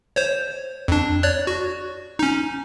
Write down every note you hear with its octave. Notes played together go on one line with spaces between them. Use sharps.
C5 C#5
F2 D4
C#5 D5 F#6
F#4
C#4 D#4